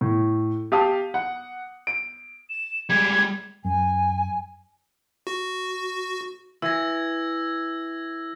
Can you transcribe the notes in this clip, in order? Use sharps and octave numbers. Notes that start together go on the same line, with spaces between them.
A2
G4 F5 A5 D#6
F#5
D7
E7
G3 G#3 G#6
F#2 G#5
F#4
E3 E6 G#6 A#6